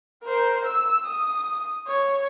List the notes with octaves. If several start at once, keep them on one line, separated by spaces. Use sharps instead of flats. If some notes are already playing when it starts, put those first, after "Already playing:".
A#4 C5
E6
D#6
C#5